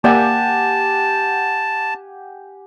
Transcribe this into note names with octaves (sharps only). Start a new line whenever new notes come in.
A#3 G4 D5 E5 F#5 G#5 A5